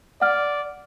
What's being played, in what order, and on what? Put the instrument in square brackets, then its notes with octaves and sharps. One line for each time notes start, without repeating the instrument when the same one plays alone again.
[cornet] D5 [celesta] F#5 F6